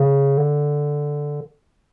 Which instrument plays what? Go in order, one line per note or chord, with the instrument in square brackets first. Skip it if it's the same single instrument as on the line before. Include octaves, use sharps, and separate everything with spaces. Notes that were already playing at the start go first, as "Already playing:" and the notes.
Already playing: [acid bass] C#3
D3